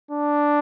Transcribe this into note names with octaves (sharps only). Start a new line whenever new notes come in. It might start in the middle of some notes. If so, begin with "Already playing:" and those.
D4